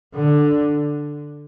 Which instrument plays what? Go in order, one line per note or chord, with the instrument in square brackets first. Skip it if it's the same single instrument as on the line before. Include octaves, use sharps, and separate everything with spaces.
[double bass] D3